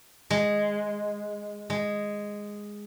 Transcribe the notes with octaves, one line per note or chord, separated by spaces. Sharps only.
G#3
G#3